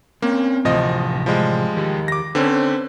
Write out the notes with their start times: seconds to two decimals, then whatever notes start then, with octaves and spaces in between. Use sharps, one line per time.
0.22 A#3 C4 C#4
0.65 D2 A2 C3 E3 F3 D#5
1.26 F3 G3 G#3
1.77 D#3 G4
2.08 D6 A#6
2.35 D3 C4 C#4 B4 C5